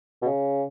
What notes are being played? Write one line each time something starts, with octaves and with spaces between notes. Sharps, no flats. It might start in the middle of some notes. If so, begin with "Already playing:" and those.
B2
C#3